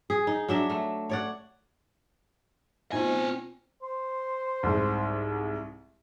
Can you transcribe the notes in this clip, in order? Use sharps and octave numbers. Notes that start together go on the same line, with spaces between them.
G#4
D#4
F#3 D4 E5
A3
C#5 D5 F#5
B2 C4 D#4 F4 C5 G#5
C5
C2 G#2